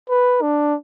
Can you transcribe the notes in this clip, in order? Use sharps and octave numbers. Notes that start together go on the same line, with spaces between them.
B4
D4